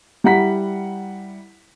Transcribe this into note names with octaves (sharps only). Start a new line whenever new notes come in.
G3 E4 F#5 A#5 B6